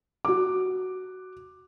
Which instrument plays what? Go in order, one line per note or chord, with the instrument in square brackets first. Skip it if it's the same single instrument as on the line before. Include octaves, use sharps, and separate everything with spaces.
[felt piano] F#4 D6